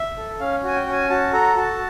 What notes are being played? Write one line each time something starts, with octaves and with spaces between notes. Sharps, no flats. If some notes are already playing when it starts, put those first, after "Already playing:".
Already playing: E5
A4
C#4 F5
F#4 G#5
G5
C#4
G#5
F#4 A5
A4 A#5
F#4 A5